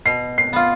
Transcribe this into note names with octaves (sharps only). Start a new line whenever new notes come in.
B2 C7
C7
B3 F4